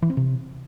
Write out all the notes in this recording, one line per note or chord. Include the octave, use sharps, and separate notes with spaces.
E3
C4
C3